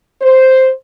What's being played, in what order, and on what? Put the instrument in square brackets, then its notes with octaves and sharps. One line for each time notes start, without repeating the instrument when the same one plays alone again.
[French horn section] C5